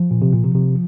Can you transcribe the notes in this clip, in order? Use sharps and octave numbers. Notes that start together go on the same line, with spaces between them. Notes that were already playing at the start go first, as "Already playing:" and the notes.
Already playing: F3
A#2
C3
A#2
C3
C3